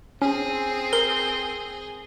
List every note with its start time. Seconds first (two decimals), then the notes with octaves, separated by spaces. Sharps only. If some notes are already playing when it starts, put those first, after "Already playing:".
0.22 C4 C#4 G#4
0.93 A#4 G7